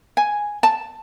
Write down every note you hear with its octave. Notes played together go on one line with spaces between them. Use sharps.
G#5
A5